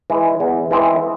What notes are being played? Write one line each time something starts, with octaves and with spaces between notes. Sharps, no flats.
E3 G#3
E2
E3 G#3 C4 E4